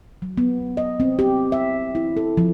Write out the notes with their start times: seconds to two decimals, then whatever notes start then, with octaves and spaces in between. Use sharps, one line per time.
0.22 F#3
0.38 B3
0.77 D#5
1.00 C4
1.19 G4
1.52 E5
1.95 E4
2.17 A4
2.37 F3